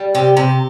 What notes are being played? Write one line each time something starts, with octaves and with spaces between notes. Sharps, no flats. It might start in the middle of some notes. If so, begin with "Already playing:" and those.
Already playing: G3
C3 G4
C3 G4